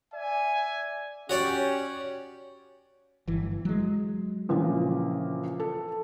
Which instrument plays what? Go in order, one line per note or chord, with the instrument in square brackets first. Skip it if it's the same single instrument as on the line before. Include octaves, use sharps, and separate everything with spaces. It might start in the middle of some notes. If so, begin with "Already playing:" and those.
[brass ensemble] D5 E5 G#5
[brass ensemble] C#4 G4 [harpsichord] F#4 C#5 D5
[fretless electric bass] G1 E3
F#3 G#3
[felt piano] A#1 C#3 E3
A4